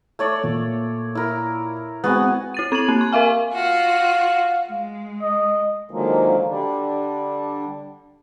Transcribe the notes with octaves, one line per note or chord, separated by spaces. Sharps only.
A3 C#5 D5
A#2
E4 A#4
G#3 B3 C4 F#4 G#5
E4 A6 D#7
C4 G#6 D#7 F#7
A#3
C6
A#4 E5 F5 G#5
F4 F#4 F5 F#5
G#3
D#5
D3 D#3 F3 F#3 G#3 A#3
D3 G3 D4